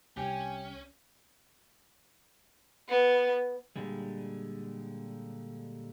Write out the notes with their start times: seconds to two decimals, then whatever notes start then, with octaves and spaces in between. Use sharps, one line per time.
0.17 C2 C#4 G4 G#5
2.89 B3
3.76 A#2 D3 G3 G#3